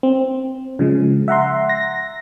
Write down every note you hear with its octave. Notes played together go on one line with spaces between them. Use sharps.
C4
C#3 F3 G#3
E5 F#5 A#5 C6
A#6